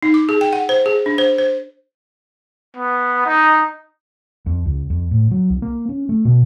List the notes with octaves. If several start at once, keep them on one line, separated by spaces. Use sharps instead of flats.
D#4
D6
G#4
G5
F#5
C5
G#4
D4
C5
C5
B3
D#4
F2
C#2
F2
A2
F#3
C2
A#3
C#4
A3
B2